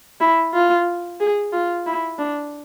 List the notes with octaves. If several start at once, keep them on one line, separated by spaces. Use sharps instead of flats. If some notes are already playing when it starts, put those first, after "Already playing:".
E4
F4
G#4
F4
E4
D4